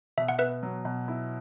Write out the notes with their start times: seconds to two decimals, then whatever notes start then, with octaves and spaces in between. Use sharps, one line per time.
0.18 B2 E5
0.29 F#5
0.39 B3 B4 E5
0.63 F#3
0.85 B2
1.08 E4